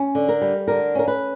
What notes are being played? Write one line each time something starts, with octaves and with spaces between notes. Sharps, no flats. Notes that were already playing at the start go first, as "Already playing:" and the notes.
Already playing: C#4
D3
A#4
G3
D3 A#4
C#4 A#4
B4